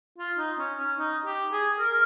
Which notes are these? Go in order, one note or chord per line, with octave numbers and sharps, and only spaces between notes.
F4
D#4
C#4
C#4
D#4
G4
G#4
A#4